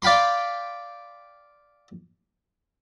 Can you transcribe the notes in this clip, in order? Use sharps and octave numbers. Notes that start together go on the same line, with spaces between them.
D5 F5 G5 B5 C6